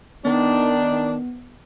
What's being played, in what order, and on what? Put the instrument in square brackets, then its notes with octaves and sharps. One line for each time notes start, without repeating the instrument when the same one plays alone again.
[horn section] D#3 D4 [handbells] B3